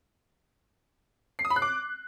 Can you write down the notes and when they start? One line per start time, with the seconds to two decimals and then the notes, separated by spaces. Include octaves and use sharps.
1.39 C7
1.45 D#6
1.50 B5
1.56 F#6
1.62 D6